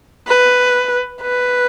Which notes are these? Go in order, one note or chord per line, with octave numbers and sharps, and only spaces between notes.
B4
B4